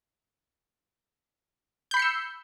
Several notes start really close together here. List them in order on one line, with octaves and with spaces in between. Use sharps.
G6 B5 C7 C#7 E6